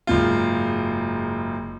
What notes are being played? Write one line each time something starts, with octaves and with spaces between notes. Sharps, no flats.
F#1 G#2 F4